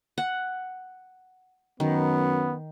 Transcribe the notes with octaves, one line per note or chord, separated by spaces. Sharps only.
F#5
F#2 D#3 B3